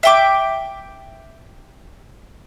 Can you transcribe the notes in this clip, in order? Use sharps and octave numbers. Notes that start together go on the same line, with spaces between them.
E5 G5 D6